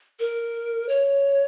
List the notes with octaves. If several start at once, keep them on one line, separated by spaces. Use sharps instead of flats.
A#4
C#5